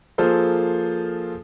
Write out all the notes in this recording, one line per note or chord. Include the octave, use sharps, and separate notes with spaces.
F3 A#3 F4 G#4 A4 C5